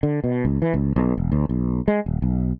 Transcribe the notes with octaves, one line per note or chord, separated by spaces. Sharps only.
D3
B2
C#2
E3
C#2
B1
E1
D2
B1
G#3
D#1
B1